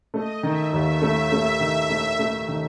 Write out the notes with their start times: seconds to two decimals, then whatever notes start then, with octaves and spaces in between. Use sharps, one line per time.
0.14 A3 D#5
0.43 D#3 E5
0.72 D#2 E5
1.02 A3
1.32 A3
1.60 D#3
1.90 A3
2.19 A3
2.48 D#3